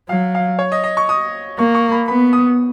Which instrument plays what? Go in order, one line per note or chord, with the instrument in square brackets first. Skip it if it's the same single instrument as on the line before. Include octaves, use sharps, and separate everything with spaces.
[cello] F#3 [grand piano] F5
[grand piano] F5
C#5
D#5
D#5
C#6
D#6
[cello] A#3 [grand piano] C#6
[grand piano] C#6
B5
[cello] B3 [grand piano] B5
[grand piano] D#6